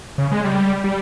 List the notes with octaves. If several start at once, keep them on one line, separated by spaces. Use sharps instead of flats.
C#3
G#3
G3
G3